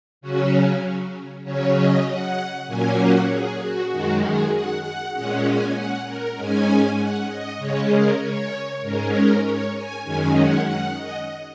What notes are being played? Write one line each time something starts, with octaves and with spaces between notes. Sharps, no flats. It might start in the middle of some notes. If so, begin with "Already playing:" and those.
C#3 F#3 C#4 F#4
C#3 F#3 C#4 C#5
D#5
F#5
A#2 F#3 A#3 C#4 G#5
F#5
G#4
F#4
F#2 D#3 G#3 F#4
G#4
F#5
F#5
A#2 G#3 C#4 F#5
G#5
F#5
A#4
G#2 G#3 C#4 G#5
F#5
D#5
C#3 G#3 C#4 C#5
A#4
C#5
G#2 G#3 C#4 A#4
A#4
C#5
G#5
F#2 D#3 G#3 C#4 G#5
F#5
F#5
D#5